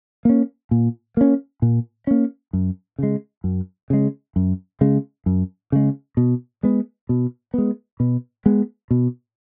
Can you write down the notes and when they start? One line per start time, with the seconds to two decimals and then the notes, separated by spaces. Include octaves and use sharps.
0.25 A#3 C#4
0.71 A#2
1.17 A#3 C#4
1.62 A#2
2.07 A#3 C#4
2.53 F#2
2.98 C#3 G#3
3.44 F#2
3.90 C#3 G#3
4.36 F#2
4.81 C#3 G#3
5.26 F#2
5.72 C#3 G#3
6.17 B2
6.63 G#3 B3
7.09 B2
7.54 G#3 B3
8.00 B2
8.46 G#3 B3
8.91 B2